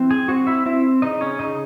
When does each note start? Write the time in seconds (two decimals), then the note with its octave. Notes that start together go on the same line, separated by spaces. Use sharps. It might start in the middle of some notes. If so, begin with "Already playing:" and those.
Already playing: E3 C4
0.11 G#4 G#5
0.28 C4 F#4 F#5
0.47 E4 E5
0.66 C4 E4 E5
1.02 C#3 D#4 D#5
1.21 C#4 C#5
1.39 C#3 D#4 D#5